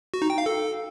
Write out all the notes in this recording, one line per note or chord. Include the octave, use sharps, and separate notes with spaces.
F#4
D#4
G5
F5
A4